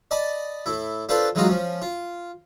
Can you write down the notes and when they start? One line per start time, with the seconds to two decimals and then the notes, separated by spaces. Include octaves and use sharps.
0.11 D5 D#5 A5 B5
0.66 A2 E4
1.09 D4 F4 A4 B4 C5 D5
1.35 E3 F#3 G#3 D#4 F4 F#4
1.48 F3 C#4
1.82 F4